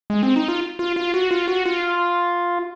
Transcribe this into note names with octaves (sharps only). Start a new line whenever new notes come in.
G#3
C4
D#4
F4
F4
F4
F#4
F4
F#4
F4